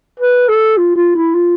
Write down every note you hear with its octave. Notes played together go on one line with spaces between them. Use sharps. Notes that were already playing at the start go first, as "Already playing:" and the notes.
B4
A4
F4
F4
E4
F4